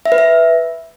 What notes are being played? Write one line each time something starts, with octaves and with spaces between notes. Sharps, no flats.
E5
B4
E5